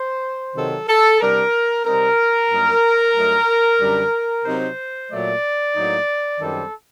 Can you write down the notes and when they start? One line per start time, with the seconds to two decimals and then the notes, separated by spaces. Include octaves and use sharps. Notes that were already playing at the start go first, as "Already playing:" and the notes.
Already playing: C5
0.55 C3 D#3 F#3 A4
0.88 A4
1.20 C3 G3 D4 A#4
1.85 C3 G3 C4 D#4 A#4
2.50 G2 F#3 A#3 D#4
3.15 G2 F#3 A3 D#4
3.80 F#2 D3 G3 D4
4.45 C3 F#3 C4 D#4 C5
5.10 A#2 F#3 A3 D5
5.76 A2 F#3 A#3 D#4
6.40 F#2 D#3 G3 C4 A4